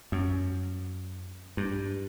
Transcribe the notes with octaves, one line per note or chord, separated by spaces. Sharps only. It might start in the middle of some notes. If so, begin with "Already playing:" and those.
F#2
G2